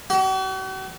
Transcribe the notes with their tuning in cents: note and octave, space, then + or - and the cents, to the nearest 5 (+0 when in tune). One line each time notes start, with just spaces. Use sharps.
F#4 +45